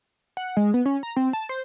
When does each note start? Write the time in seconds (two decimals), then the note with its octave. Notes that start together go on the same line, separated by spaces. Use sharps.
0.37 F#5
0.57 G#3
0.74 B3
0.86 C#4
1.03 A#5
1.16 C4
1.33 A5
1.49 C5